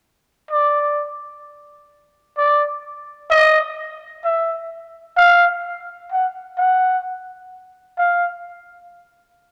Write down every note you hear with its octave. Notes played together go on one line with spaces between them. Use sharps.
D5
D5
D#5
E5
F5
F#5
F#5
F5